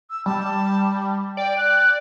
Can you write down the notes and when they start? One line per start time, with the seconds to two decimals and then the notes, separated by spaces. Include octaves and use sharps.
0.10 E6
0.26 G3 A5
1.37 D5 G5
1.58 F#6